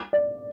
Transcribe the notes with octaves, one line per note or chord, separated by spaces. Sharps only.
D5